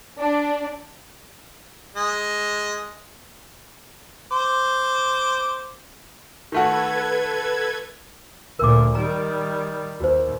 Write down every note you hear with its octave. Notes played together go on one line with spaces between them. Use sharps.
D4
G#3
C5 D6
D#3 A3 F#4 A4 B4 G#6
D2 A#2 A#4 D6
D#3 G3 A#5
D#2 F#4 C5